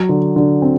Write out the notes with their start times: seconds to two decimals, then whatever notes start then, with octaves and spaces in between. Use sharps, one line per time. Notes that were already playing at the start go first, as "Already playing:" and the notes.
Already playing: F#3
0.09 D3
0.36 D3
0.62 C4